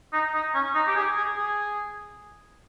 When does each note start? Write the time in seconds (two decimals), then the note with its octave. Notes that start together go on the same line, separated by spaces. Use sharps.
0.13 D#4
0.34 D#4
0.54 C#4
0.75 D#4
0.87 G4
0.96 G#4
1.16 G#4
1.37 G#4